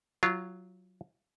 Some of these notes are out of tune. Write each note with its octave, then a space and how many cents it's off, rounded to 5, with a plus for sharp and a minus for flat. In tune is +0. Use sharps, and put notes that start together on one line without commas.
F#3 +0 F4 -20